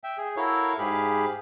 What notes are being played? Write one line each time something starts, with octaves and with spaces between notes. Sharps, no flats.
E5 G5
G#4
E4 F#4 A4 A#4 C#5 F5
G#2 G4 G#4 F5 B5